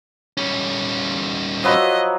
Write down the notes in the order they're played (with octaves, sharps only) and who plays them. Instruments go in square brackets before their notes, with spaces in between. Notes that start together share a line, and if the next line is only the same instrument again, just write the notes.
[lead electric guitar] G3 C#4
[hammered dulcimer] F3 F#3 B4 [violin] D#5